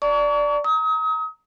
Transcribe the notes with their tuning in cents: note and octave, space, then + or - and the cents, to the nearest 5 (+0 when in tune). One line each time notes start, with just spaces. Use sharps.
D5 +0 A5 +45 C#6 +40
A#5 +0 D#6 +40